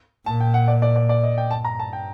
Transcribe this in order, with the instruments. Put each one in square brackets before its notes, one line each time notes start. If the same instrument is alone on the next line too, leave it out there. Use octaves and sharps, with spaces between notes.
[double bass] A#2 [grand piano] A5
[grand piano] G5
F#5
D5
D5
D5
D5
D#5
G5
[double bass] G2 [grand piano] A5
[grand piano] A#5
A5
G5